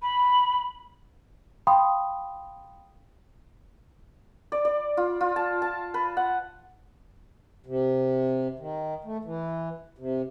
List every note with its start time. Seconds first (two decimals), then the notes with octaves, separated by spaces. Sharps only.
0.02 B5
1.67 F5 G5 B5 C6 D#6
4.52 D5
4.65 D5
4.97 F4
5.21 F4
5.36 A5
5.62 A5
5.94 B4
6.17 F#5
7.66 C3
8.59 D#3
9.04 A3
9.25 E3
9.98 C3